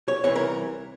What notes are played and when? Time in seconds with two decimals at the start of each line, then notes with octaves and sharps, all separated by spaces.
0.08 C#5
0.24 C2 C3 E3 C#5
0.36 A#4